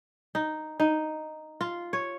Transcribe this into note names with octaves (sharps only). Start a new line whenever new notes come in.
D#4
D#4
F4
C#5